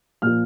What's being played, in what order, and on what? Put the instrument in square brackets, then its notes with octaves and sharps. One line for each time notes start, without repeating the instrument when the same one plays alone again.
[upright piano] A#2 F3 F6